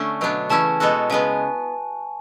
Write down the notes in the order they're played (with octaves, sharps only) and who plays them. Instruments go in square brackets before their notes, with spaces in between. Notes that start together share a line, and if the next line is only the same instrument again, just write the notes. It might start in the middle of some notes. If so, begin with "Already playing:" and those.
Already playing: [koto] D3 A3 C#4 [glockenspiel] C#6
[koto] B2 F#3 B3 D4
[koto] C#3 E3 A3 C#4 E4 [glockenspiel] A5
[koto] B2 G#3 B3 F#4 A4
[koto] C#3 G#3 B3 [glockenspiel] G#5